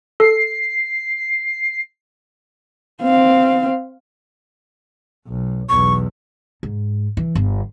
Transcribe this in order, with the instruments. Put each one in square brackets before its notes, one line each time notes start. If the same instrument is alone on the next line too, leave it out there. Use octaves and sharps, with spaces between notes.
[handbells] A4 [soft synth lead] C7
[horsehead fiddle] C4 F5
[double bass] B1
[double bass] B1 E2 [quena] C#6
[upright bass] G#2
E3
G1